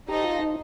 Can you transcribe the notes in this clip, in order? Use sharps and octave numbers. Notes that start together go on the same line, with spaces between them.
D#4 G4 A4 C5 D#5
F4
D#4